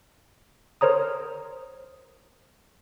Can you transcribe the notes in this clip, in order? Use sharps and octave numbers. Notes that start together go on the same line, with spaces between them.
A#4 C5 C#5 A#5 D#6